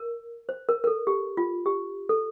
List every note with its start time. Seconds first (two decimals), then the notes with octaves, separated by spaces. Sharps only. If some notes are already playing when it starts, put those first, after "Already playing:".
Already playing: A#4
0.49 C5
0.69 A#4
0.84 A#4
0.87 A4
1.07 G4
1.37 F4
1.66 G4
2.09 A4